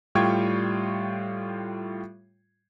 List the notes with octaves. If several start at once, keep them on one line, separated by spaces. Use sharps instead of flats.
A2 G3 F4 G5 C#6 G#6